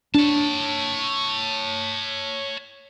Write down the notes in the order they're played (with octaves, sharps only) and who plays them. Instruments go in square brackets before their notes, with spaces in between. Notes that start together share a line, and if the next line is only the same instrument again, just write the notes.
[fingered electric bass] D4 [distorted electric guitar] C#5 A5